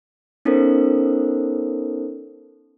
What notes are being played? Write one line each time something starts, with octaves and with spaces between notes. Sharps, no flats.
B3 C#4 D#4 A4 A#4 C5